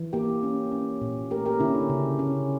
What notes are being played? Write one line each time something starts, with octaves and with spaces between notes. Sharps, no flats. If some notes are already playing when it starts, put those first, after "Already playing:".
Already playing: E3
A#3 E4 G4
C#4
C#4
A#2
A3 G4 A#4
G4 A#4
D3 C#4 E4
D4
C#3
C#4